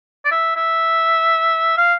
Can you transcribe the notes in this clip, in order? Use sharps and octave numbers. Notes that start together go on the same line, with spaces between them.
D5
E5
E5
F5